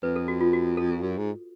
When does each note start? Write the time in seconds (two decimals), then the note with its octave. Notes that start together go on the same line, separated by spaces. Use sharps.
0.03 F2 B4
0.16 A4
0.28 F#4
0.41 F4
0.53 F#4
0.77 A4
1.02 F#2
1.18 G#2